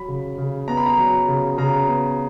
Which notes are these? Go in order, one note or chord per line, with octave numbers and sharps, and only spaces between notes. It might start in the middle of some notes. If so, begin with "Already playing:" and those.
Already playing: F#3 B5
C#3
C#3
B3 A#5
B5
A#5
F#3
C#3
C#3 A#5
B3